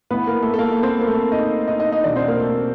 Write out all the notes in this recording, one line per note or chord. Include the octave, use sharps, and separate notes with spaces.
A2 E3 B3 B4
A#3 A#4
A3 A4
A4
A#3 A#4
C4 C5
A#4
A3 A4
D#4 D#5
D#4 D#5
D#4 D#5
D#4 D#5
E2 B2 D4 D5
C4 C5
A#3 A#4
A3 A4